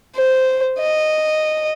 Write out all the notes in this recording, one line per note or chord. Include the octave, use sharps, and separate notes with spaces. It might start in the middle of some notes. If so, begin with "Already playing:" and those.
C5
D#5